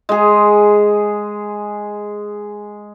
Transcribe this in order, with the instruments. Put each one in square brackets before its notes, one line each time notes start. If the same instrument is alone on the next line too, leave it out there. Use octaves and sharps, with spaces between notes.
[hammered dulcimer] G#3 G#4